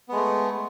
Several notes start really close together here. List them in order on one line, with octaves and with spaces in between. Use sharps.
B3 G#3 A3